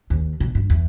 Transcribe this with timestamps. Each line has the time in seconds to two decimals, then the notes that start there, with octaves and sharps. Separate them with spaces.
0.10 D#2
0.40 B2
0.55 G2
0.70 E2